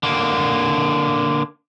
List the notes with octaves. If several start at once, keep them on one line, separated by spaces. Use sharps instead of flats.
D3 A#3